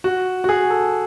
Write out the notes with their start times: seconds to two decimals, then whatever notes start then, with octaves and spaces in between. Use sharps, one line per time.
0.04 F#4
0.44 F#4
0.49 G#4
0.70 A4